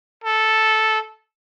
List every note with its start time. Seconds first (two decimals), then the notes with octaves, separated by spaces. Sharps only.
0.24 A4